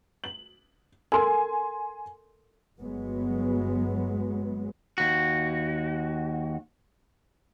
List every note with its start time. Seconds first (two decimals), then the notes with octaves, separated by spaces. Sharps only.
0.24 F#7
1.12 A4 A#4 G#5 C6
2.80 G1 F#3 G#3 B3
4.98 D#2 F#4